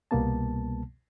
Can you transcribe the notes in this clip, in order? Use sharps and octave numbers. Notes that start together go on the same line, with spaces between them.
C2 B2 G3 A#3 B3 A5